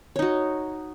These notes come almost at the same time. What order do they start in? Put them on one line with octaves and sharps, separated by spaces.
C#5 D#4 F#4